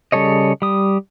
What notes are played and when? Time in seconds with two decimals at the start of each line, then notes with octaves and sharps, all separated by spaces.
0.12 C#3 G3 A4 C#5 D#5
0.62 G3 D#6